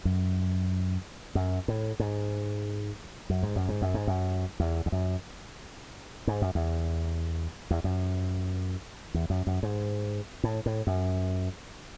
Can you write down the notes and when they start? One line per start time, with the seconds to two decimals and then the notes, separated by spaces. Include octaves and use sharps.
0.05 F#2
1.35 F#2
1.68 A2
2.00 G#2
3.30 F#2
3.43 G#2
3.56 F#2
3.69 G#2
3.82 F#2
3.94 G#2
4.07 F#2
4.60 E2
4.86 E2
4.92 F#2
6.27 G#2
6.42 F#2
6.55 E2
7.71 E2
7.84 F#2
9.14 E2
9.30 F#2
9.47 F#2
9.63 G#2
10.44 A2
10.66 A2
10.87 F#2